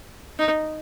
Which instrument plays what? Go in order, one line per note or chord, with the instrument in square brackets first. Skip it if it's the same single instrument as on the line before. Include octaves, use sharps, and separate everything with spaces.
[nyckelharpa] D#4